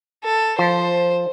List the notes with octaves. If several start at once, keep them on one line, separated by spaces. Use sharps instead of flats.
A4
F3 C5